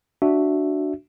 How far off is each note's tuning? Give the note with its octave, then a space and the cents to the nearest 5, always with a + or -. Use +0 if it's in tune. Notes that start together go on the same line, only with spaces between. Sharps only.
D4 +0 F#4 +0 E5 +0